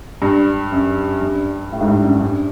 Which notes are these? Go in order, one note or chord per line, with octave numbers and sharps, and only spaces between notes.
G2
F#2
G2
A2
G#2
G2
F#2
G2